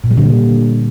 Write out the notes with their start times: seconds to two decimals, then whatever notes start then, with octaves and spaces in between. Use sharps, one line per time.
0.04 A#2
0.11 G3
0.17 D3